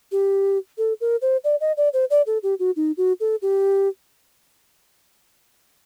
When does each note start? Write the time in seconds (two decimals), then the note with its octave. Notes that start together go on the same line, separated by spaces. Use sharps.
0.12 G4
0.78 A4
1.01 A#4
1.22 C5
1.44 D5
1.61 D#5
1.77 D5
1.93 C5
2.10 D5
2.26 A4
2.43 G4
2.59 F#4
2.76 D#4
2.97 F#4
3.20 A4
3.42 G4